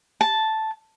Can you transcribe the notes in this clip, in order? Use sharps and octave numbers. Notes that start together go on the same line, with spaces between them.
A5